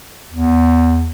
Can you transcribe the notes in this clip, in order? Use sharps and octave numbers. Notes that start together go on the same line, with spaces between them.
E2